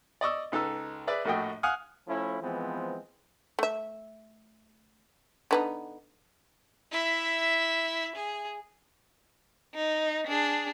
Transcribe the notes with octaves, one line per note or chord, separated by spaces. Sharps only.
D5 D#5 C#6 E6
C#2 D#4 A4 B4 E6
G#4 B4 D5 E5
A#1 A2 A3 F#4 D#5 G5
F5 F#5 G#5 D#6 F6 F#6
F3 A3 C#4 E4
E3 F3 G#3 B3 C4
A3 E5
D3 B3 D#4
E4 E5
G#4
D#4
D4 G#4